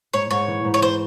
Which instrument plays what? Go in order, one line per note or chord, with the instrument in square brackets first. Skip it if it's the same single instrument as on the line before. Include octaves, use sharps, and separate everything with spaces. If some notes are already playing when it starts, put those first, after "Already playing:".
[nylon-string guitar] G#2 [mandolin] C#5
[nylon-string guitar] G#2 [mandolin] C#5
[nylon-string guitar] E3
G#2
[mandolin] C#5
[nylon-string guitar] E3 [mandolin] C5